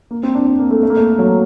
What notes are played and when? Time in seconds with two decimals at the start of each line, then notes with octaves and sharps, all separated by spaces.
0.11 A#3
0.23 C4
0.35 D4
0.47 D4
0.59 A#3
0.71 A3
0.83 A3
0.90 A#3
0.97 A3
1.19 F#3